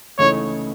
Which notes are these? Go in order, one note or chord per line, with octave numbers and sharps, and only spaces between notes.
C#2 C#3 E3 A3 D#4 C#5